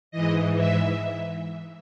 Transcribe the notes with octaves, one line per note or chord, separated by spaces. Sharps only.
G#2 E3 D#5
E5